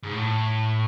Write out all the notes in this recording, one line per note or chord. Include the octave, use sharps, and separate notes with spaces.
G#2
A2